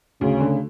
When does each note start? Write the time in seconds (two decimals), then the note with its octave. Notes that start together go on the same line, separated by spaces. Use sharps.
0.21 D2 C#3
0.40 D3 A3